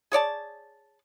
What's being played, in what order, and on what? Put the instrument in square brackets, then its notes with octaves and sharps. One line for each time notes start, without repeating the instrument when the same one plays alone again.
[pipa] G#4 C#5 D5 A5